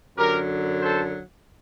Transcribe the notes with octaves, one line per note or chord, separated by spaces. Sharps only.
F#2 D3 F#3 G4 A#4
A4 C5